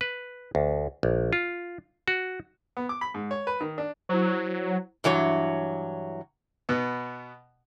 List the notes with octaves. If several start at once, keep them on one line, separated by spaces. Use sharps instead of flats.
B4
D2
A#1
F4
F#4
B3
D6
B5
G#2
C#5
B4
D#3
D4
F#3 E4 C5
G2 E3 F#3 C#5
B2 B3